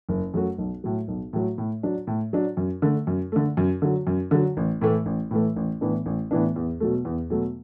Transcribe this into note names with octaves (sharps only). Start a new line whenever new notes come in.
F#1
F#2 F#3 A3 F#4
B1
A2 F#3
B1
A2 F#3
A2
F#3 D4
A2
F#3 D4
F#2
D3 A3
F#2
D3 A3
F#2
D3 F#3
F#2
D3 F#3
A1
A2 E3 A3
A1
A2 E3 A3
A1
A2 E3 B3 D4
A1
A2 E3 B3 D4
E2
B2 F#3 A3
E2
B2 F#3 A3